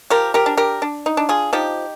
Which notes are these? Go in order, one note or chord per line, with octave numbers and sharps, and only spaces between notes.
F3 G4 A#4
G4 A#4
D4
G4 A#4
D4
D#4
D4
F4 G#4
F3 D#4 G4